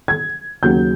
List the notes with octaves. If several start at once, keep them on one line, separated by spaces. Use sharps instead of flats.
G#6
D#2 C#3 F#3 G6